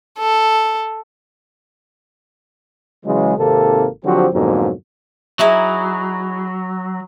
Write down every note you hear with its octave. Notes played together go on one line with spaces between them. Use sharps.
A4
C#3 E3 F#3 G#3
G#1 C3 D#3 A#3 A4
D3 F3 F#3 C4 F#4 G4
F2 G#2 B2 D3 F#3 A#3
F#3 D#4 E4 G#4